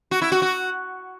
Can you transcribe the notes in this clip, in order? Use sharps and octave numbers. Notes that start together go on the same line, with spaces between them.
F#4
E4
F#4
F#4